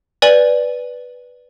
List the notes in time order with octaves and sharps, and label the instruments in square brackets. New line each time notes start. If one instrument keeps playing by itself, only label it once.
[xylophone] B4 D5 G#5 F#7